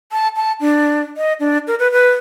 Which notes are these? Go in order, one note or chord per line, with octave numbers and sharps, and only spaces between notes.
A5
A5
D4
D#5
D4
A#4
B4
B4